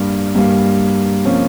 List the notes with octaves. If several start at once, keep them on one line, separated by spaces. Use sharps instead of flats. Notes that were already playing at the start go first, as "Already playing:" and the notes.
Already playing: G2 G3 A#3
G2 G3 A#3
C3 F3 A#3 C#4